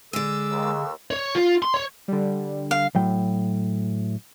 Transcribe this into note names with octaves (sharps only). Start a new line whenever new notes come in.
D3 G#3 G#4 D5 E6
D#2
C#5
F4
C6
C#5
D3 G3
F5
A2 F#3 G5